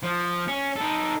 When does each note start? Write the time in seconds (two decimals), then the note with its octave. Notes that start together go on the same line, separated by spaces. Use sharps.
0.03 F3
0.48 C#4
0.76 D#4 A4